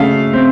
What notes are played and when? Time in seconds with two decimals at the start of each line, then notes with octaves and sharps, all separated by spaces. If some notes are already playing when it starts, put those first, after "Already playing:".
Already playing: C#3 A3 F5
0.33 C4